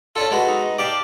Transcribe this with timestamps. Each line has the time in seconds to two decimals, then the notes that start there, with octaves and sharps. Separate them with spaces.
0.16 C#4 D4 F4 A4
0.31 G#3 B3 F#4
0.47 D#4
0.79 G4 D5 F5 A5